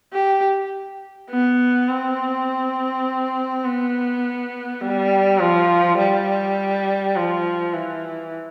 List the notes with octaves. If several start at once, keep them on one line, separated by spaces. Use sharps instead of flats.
G4
B3
C4
B3
G3
F3
G3
F3
E3